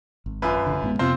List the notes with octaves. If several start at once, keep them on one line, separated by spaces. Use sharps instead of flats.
G#1
F#2 F4 B4
A1 D3
A1 G#2 B3
F2 C3 B3 C4 F4 C5